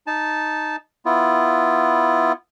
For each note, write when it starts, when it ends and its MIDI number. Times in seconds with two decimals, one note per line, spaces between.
0.07 0.76 63
0.07 0.76 81
1.06 2.32 59
1.06 2.32 64
1.06 2.32 65